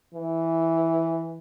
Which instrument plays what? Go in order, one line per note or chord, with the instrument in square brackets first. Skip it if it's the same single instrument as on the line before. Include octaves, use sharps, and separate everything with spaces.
[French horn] E3